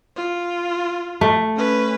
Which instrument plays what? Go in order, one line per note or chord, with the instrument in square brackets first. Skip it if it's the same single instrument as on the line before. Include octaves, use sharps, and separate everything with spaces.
[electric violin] F4
[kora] A3
[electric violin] C#4 B4